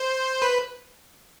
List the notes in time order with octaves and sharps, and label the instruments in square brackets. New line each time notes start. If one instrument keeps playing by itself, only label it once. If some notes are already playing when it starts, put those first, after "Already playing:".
Already playing: [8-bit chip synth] C5
B4